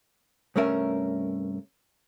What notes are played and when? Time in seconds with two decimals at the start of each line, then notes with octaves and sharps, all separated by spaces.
0.56 C2 G2 A3 C#4 A#4 E5